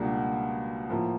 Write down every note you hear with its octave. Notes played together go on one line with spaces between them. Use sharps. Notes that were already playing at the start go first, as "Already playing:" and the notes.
Already playing: C#2 B2 G3 A#3 D4
A2 F3 A#3